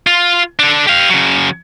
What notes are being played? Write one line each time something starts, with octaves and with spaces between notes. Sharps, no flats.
F4
D4 A4
G4 F5
C#3 F#3